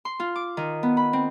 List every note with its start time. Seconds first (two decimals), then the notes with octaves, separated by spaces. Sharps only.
0.05 C6
0.20 F4
0.36 D6
0.57 D#3
0.83 B3
0.97 B5
1.13 C4